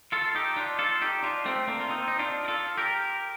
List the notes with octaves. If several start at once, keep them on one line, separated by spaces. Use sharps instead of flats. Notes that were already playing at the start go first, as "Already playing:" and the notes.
F4 A4
D#4 G4
D4 F4
F4 A4
D#4 G4
D4 F4
A3 C4
A#3 D4
F4
C4 D#4
D#4
D4 F4
A#4
F4 A4
G4 A#4